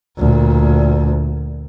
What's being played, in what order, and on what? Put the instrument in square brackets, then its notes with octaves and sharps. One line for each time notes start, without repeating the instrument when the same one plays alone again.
[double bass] D2 A#2